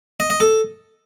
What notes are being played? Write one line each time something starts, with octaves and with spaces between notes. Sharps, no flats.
D#5
D#5
A4